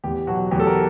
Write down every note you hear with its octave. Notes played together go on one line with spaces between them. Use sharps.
E2 G4
B2 F#3 F#4
E2 G4
A4
A#4